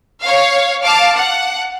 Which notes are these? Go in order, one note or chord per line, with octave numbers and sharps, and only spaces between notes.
C#5 F5
F5 A5 D6 F6
F#5